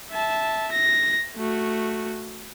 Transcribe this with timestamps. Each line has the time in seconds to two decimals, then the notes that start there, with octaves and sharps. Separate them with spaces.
0.11 E5 A5
0.72 A#6
1.36 A3 F#4